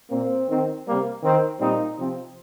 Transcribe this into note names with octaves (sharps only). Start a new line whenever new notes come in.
A#2 A#3 C4
D#3 C4
C3 G3 A#3
D#3 C4
A#2 G3 C4 D#4
C3 F3 C4